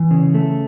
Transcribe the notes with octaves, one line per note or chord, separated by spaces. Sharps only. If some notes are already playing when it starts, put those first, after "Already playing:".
Already playing: E3
C#3
A3